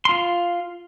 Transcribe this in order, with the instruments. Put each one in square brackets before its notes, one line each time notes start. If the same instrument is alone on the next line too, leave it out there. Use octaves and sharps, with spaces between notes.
[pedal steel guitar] F4 C6